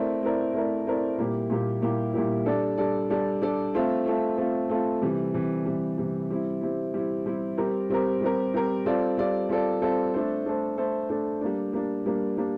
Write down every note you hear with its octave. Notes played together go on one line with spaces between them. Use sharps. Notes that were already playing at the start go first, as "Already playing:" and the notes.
Already playing: A3 C4 E4 A#4 D5
A3 C4 E4 A#4 D5
A3 C4 E4 A#4 D5
A3 C4 E4 A#4 D5
A#2 G3 A#3 E4 G4
A#2 G3 A#3 E4 G4
A#2 G3 A#3 E4 G4
A#2 G3 A#3 E4 G4
G3 D4 A4 D5
G3 D4 A4 D5
G3 D4 A4 D5
G3 D4 A4 D5
A3 C4 F4 A4
A3 C4 F4 A4
A3 C4 F4 A4
A3 C4 F4 A4
C3 E3 G3
C3 E3 G3
C3 E3 G3
C3 E3 G3
G3 C4 E4
G3 C4 E4
G3 C4 E4
G3 C4 E4
G3 C4 G4 A#4
G3 C4 G4 A#4
G3 C4 G4 A#4
G3 C4 G4 A#4
G3 C4 F4 A4 D5
G3 C4 F4 A4 D5
G3 C4 F4 A4 D5
G3 C4 F4 A4 D5
A3 D4 A4 C5
A3 D4 A4 C5
A3 D4 A4 C5
A3 D4 A4 C5
G3 A#3 D4
G3 A#3 D4
G3 A#3 D4
G3 A#3 D4